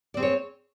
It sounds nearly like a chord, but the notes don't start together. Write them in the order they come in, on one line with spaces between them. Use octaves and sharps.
D5 C4 G#4 C#5